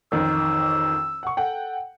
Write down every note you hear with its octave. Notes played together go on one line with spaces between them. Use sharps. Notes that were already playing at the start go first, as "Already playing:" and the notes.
A1 F2 D#3 E6
F#5 C#6
A4 F#5 G5